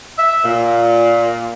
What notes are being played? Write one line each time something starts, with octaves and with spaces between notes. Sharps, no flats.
E5
A#2